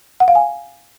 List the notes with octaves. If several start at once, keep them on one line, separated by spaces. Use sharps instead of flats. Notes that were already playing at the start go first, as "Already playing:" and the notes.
F#5
F5
G#5